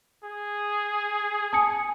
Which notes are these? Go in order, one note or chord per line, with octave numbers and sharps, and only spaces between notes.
G#4
G#5 A5 D#6 C#7